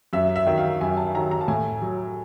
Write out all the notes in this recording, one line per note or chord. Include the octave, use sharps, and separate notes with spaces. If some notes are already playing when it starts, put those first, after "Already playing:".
F#2 E5
E5
D#3 F#3
F5
F#2 G#5
A5
D#3 F#3 A#5
A#5
A5
A2 G#5
F#3